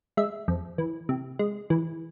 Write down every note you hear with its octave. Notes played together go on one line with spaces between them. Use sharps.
G#3 E5
F2
E3
C3
G#3
E3